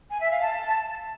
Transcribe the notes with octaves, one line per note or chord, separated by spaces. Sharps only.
G#5
E5
F5
A5